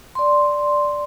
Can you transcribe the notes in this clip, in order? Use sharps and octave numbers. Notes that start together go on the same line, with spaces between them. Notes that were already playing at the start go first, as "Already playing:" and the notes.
D5 C6